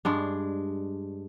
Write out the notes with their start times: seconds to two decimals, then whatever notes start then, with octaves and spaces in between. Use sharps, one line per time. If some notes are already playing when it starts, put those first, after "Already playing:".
0.05 G2 G#3 D4